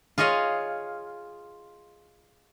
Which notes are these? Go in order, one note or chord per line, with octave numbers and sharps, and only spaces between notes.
F4 G#4 C#5 D#5 F5